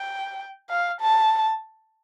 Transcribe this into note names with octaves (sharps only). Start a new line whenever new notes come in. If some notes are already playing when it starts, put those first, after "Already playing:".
Already playing: G5
F5
A5